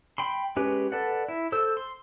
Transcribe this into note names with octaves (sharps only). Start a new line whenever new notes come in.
G5 B5 C6
G#3 C#4 G4 B4
A4 B4 D5 F#5
E4
A4 C5 E6
C6